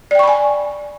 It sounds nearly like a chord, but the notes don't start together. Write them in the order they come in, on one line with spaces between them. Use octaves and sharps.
D5 G5 C#6 B5 G#5